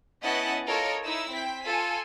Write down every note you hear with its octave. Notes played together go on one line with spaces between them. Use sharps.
B3 C#4 E4 D#5 F#5 A5
F4 A4 A#4 C#5 D#5
D#4 E4 E6
C4 G5 B6
F4 A4 G#5